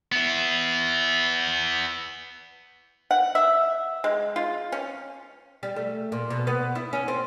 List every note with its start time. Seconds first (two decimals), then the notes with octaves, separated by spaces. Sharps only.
0.12 B3 E4
3.11 F#5
3.35 E5
4.04 G#3
4.36 F4
4.72 C#4
5.63 G3
5.76 A3
6.12 A#2
6.30 B2
6.47 B3
6.75 E4
6.93 C#4
7.08 C4